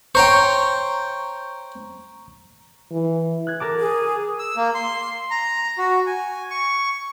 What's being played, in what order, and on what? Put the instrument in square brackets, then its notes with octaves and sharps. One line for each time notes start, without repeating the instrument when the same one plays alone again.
[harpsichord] C5 C#5 G5 [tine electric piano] A#5 C#6
[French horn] E3
[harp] F#6 G#6
A#4 A5 D6
[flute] G#4
[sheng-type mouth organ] E6
A#3
C6
A#5
F#4
G#5
C#6